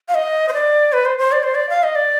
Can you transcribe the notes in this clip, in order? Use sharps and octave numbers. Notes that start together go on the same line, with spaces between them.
F5
D#5
C5
D5
B4
C5
C5
D5
C5
D5
F5
D#5
D5